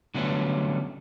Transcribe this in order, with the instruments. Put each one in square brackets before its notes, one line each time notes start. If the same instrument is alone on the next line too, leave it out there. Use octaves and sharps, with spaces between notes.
[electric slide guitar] D3 F#3 G3 A3 B3 C#4